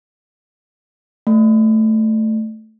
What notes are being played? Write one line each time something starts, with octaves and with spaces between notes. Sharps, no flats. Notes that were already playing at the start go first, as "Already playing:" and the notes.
A3